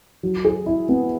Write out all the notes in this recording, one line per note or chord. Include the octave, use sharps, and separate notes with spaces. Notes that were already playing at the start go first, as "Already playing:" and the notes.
F#3
G#4
E4
B3